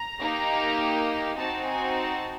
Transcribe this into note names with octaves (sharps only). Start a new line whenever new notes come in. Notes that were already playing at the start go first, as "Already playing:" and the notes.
Already playing: A#5
A#3 D#4 G4
C4 D#4 F#4 A5
G#5
A5